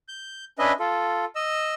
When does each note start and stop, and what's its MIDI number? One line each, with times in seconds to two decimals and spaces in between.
0.08 0.45 91
0.59 0.72 61
0.59 0.72 62
0.59 0.72 71
0.59 0.72 75
0.59 0.72 76
0.80 1.25 65
0.80 1.25 69
1.36 1.74 75
1.36 1.74 88